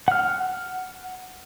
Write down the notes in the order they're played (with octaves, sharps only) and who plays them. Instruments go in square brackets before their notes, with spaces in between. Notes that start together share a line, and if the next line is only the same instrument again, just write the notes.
[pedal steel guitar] F#5 F6